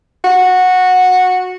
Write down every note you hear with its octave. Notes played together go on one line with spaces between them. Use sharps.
F#4